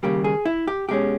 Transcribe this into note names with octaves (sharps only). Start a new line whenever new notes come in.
D#2 C#3 G3 A#3 G4
G#4
E4
G4
B2 G#3 C#4 G4